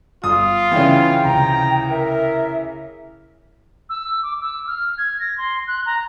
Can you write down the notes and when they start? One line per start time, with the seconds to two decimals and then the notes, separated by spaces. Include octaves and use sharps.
0.24 G1 F4 D#6
0.72 C#3 E3 G5
1.25 C#2 C3 A#5
1.90 A#4 E5
3.89 E6
4.23 D6
4.40 E6
4.67 F6
4.98 G#6
5.20 A#6
5.38 C6
5.67 F#6
5.86 A#5